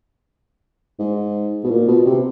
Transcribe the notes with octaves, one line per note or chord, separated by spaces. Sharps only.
G#2
B2
A#2
B2
C3